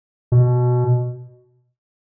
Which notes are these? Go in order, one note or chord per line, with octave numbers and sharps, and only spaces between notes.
B2